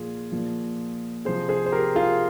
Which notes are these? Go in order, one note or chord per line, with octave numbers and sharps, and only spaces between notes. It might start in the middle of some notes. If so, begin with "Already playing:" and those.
Already playing: A#2 F3 F4 G#4
A#2 F3
C3 F3 G#4 C5
G#4 C5
C5
G4 A#4
F4 G#4